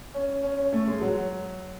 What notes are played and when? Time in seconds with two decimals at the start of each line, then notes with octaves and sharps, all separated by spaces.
0.14 C#4
0.43 C#4
0.58 C#4
0.73 A3
0.87 G#3
1.01 F#3